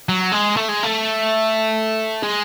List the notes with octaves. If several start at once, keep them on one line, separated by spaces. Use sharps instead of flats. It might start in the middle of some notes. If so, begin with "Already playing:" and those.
F#3
G#3
A3
G#3
A3
G#3